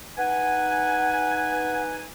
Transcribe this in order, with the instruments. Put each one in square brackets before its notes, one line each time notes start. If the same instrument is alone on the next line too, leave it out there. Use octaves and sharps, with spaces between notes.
[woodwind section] D#4 B4 G#5 [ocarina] F#5